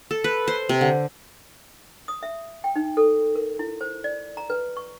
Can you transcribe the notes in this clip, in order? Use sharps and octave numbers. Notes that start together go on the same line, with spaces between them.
A4
B4
C5
C3
D3
D#6
E5
G5
D#4
A4
A#4
E4
C5
D5
A#5
B4
C#6